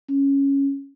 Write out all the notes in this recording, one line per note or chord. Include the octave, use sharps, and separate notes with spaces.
C#4